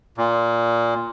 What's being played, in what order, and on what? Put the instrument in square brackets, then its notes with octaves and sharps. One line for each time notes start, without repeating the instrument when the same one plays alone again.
[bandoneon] A#2